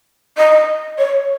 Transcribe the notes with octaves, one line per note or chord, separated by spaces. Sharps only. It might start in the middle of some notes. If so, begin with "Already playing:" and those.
D#5
C#5